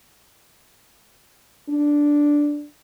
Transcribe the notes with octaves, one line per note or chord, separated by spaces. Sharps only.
D4